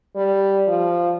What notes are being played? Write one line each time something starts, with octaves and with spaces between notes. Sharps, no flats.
G3
F3